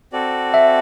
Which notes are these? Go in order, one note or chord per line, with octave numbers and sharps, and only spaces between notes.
C4 F#4 A4 D5
E5